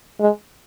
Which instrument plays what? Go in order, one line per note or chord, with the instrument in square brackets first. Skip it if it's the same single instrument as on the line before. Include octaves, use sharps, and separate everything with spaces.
[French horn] G#3